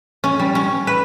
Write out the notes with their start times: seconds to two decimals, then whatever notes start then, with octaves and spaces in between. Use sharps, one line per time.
0.24 C#4
0.40 G3
0.55 C#4
0.87 B4